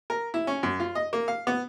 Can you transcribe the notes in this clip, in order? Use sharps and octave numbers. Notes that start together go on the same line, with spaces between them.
A#4
E4
C#4
F#2
F4
D#5
A#3
F5
B3